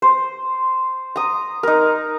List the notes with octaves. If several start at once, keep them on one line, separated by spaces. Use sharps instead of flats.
C5
A#5 D#6
D#4 A#4